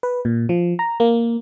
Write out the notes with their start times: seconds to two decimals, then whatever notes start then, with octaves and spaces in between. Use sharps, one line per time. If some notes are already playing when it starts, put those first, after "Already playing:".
0.03 B4
0.25 A#2
0.49 F3
0.79 A#5
1.00 A#3